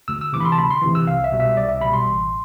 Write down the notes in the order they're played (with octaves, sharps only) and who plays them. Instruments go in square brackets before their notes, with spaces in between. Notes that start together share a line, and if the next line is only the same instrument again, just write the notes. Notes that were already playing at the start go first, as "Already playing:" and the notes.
[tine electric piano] D2 E6
E6
C3 E3 D6
B5
C6
A5
D2 B5
C6
C3 E3
E6
C2 F5
E5
B2 G3
E5
C2 D5
E5
B2 G3 B5
C6
A1